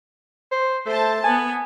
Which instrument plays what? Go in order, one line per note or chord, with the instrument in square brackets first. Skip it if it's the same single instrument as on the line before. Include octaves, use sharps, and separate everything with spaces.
[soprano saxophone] C5
[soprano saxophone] A3 [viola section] C5 A5
[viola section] B3 [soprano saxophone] G#5